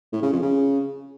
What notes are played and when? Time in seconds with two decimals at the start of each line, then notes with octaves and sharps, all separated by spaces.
0.13 A2
0.23 C#3
0.33 F2
0.43 C#3